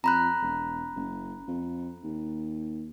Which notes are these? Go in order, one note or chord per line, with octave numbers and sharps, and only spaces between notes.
F2 A#5 B5 F#6
E1
F#1
F2
D#2